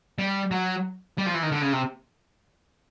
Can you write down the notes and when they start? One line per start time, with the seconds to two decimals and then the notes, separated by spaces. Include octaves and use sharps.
0.18 G3
0.51 F#3
1.18 G3
1.26 F3
1.34 E3
1.43 D#3
1.51 D3
1.62 C#3
1.73 C3